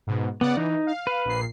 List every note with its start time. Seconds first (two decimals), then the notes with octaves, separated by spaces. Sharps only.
0.07 G#2 B2
0.41 C#3 B3 D5 F#5
0.57 E3 D#4
0.87 F5
1.07 B4
1.25 A#1 A#2 C7